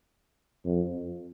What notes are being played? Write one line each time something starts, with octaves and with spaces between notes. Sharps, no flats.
F2